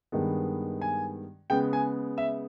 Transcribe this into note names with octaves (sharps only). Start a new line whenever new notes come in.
G2 D#3 G#3 B3
G#5
C#3 G#3 B3 G5
G#5
E5